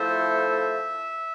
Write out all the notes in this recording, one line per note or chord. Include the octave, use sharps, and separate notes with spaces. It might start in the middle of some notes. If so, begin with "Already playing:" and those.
Already playing: F3 A3 E4 A4 C5 E5